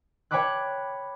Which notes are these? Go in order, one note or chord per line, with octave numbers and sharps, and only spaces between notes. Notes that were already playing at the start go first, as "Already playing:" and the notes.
C#5 G5 A5 B5 D6 F#6